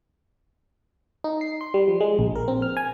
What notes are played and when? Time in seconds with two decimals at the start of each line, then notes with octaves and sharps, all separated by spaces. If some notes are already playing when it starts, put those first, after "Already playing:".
1.24 D#4
1.41 C7
1.61 C6
1.74 G3
1.88 F3
2.01 G#3
2.19 A#1
2.35 A#4
2.48 C4
2.62 F6
2.77 G#5